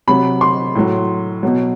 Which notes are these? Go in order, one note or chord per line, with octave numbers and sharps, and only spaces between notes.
C3 F#3 B5
C6
A2 F#3
B2 F#3